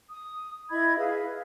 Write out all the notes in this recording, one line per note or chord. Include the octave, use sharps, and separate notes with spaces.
D#6
E4 D#5 B5 G#6
G#4 B4 E5 F5